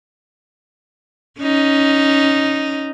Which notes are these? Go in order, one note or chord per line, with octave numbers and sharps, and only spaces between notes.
C#4 D#4